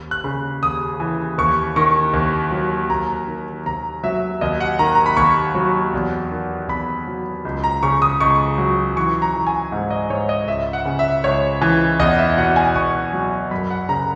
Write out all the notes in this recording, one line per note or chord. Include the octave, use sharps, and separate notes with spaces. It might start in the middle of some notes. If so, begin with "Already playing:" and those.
Already playing: D#2
F#6
C#3
D#2 D#6
E3
D#2 C#6
D#3 C#6
D#2
F#3
D#2 A#5
D#3
D#2 A#5
F#3 E5
D#2 D#5
F#5
D#3 A#5
A#5
B5
D#2 C#6
F#3
E2
D#3
E2 B5
F#3
C#2
A#5
C#3 C#6
D#6
C#2 C#6
F#3
E3 C#6
A#5
E3
G#5
G#2
D#5
G#2 C#5
D#5
C#2 E5
F#5
C#3
E5
C#2 C#5
E3
E2 D#5
E5
B2 F#5
G#5
E2 C#6
F#3
F#2 B5
F#5
C#3 A#5